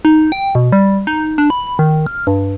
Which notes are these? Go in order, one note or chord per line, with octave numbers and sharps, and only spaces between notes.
D#4
G5
B2
G3
D#4
D4
B5
D#3
F6
G2